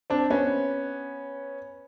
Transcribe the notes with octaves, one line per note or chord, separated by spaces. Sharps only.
C4 D4
B3 C#4